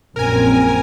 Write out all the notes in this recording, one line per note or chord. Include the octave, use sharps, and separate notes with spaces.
A#1 F#2 C4 A#4 G#5